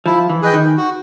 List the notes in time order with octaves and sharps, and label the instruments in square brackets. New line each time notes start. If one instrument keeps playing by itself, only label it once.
[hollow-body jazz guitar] F3 [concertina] E4
[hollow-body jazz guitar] E3
[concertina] G#4 B4 D#5 G5
[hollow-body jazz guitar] D#3
[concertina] F#4